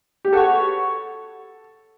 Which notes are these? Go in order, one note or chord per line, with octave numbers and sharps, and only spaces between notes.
G4
B3 F#4 A4 C#5